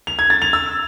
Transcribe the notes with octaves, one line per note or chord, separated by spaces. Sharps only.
F7
G#6
A6
F7
E6